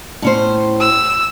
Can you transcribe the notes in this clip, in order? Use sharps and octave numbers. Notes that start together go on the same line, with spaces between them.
A2 C#4 C5
E6